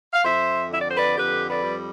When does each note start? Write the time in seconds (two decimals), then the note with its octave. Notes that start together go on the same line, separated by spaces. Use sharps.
0.13 F5
0.24 F2 C5 E5
0.70 D3 E5
0.80 D5
0.88 C5
0.97 B4 D5
1.16 F2 G4 B4
1.48 B4 D5
1.63 G3